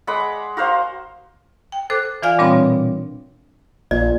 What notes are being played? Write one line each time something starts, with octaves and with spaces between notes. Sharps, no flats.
G#3 F#5 B5 D6
F#4 A#4 C5 F5
G5
A4 C5 D6 F#6
E3 F4 D5 F5 G#5 F6
A#2 G3 C4 D4 C#5 B5
B2
A#1 A#2 D5